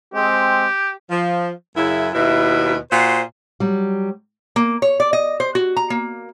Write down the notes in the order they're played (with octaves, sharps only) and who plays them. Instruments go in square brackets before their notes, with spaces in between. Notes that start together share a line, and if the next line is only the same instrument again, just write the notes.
[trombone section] G#3 C4 [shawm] G4
[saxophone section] F3
F#2 C#3 E4
D#2 B2 E4
A#2 F#4 C5
[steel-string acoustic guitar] F#3 G3
[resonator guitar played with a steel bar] A#3
C#5
D5
D#5
C5
F#4
A#5
A#3